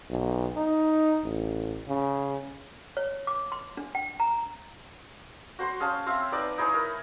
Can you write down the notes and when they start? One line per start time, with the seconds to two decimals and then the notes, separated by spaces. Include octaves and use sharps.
0.10 B1
0.56 D#4
1.24 A1
1.88 C#3
2.97 C#5
3.27 D6
3.52 C6
3.77 D4
3.95 G5
4.20 A#5
5.59 F#4 C5 B5 C6
5.80 C#4 G#4 F5 A5
6.06 C4 C5 E5 F5
6.32 D#4 B4 D5 G5
6.58 D#4 E4 G#4 C#5
6.74 A#4